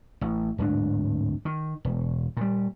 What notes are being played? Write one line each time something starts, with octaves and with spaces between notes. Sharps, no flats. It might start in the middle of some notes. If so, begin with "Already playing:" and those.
A1
D1 G#2 D4
D#3
E1
A#2 G3